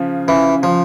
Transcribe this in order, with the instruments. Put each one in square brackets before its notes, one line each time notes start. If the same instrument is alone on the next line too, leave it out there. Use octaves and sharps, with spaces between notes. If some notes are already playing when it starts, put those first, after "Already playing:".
Already playing: [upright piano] C#3 F3
[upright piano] C#3 [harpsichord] E3
[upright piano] C#3 [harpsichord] F3